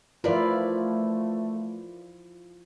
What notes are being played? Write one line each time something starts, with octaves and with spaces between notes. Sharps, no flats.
F3 A3 E4 F4 A#4 B4 D5